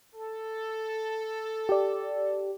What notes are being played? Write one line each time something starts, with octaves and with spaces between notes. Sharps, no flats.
A4
G4 D5